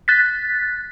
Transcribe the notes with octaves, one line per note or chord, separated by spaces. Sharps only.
F#6 A6 B6